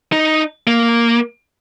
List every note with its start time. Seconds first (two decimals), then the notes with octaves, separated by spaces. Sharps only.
0.12 D#4
0.67 A#3